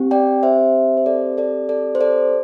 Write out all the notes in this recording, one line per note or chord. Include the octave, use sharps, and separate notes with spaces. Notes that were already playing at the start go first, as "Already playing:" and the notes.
Already playing: C4 G4
D5 G5
C5 E5
C5
A4 D5
A4 D5
A4 D5
C5
A4 D5